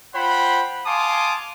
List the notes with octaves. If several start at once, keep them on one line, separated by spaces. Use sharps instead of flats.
F4 C5 F#5 G5 B5
F5 G#5 A5 C6 D6 D#6